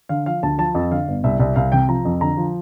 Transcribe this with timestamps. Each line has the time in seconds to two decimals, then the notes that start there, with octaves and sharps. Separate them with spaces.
0.09 D3 F5
0.26 F3 F5
0.43 D2 A5
0.58 F3 A5
0.75 F2
0.91 D3 F5
1.08 G1
1.24 C2 E5
1.40 C2 E5
1.56 C2 F5
1.72 C3 G5
1.88 F3 A#5
2.05 F2
2.21 D3 A#5
2.37 F3